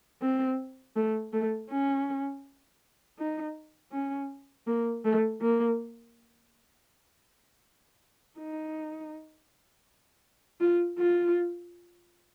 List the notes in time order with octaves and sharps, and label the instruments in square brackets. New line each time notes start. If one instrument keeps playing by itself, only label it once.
[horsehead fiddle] C4
A3
A3
C#4
D#4
C#4
A#3
A3
A#3
D#4
F4
F4